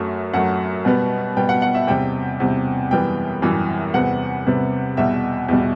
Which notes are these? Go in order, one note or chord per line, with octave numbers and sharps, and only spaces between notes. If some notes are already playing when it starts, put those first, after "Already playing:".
Already playing: F#2 F#3 A3
F#2 F#3 A3 F#5
B2 G3 B3
B2 G3 B3 G5
F#5
F#5
E5
E2 C3 G3 G5
E2 C3 G3
F#2 E3 G3 B3 G5
F#2 E3 G3 B3
E2 C3 G3 B3 F#5
E2 C3 G3 B3
E2 B2 G3 E5
E2 B2 G3